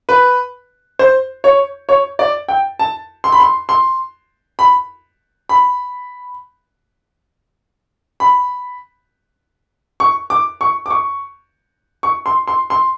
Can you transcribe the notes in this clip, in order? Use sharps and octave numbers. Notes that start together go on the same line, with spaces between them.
B4
C5
C#5
C#5
D5
G5
A5
C6
B5
C6
C6
B5
B5
B5
C#6
D6
C#6
D6
C#6
C#6
C6
C6
C6